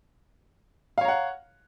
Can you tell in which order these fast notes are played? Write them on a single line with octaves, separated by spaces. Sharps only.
F5 C#5 A#5 F#5